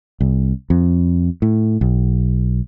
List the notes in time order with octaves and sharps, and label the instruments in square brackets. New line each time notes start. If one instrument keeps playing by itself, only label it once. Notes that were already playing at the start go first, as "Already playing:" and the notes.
[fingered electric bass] C2
F2
A2
B1